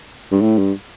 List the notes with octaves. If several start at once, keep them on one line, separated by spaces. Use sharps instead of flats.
G2
A2
G2